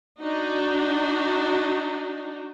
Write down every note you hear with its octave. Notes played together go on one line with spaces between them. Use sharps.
D4 D#4 F#4